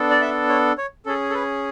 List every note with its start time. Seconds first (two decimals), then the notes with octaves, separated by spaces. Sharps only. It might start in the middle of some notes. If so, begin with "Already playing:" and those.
Already playing: B3 D4 A4
0.10 D5
0.21 E5
0.49 C#5
0.78 C#5
1.06 C#4 G#4 A4
1.30 A4
1.34 B4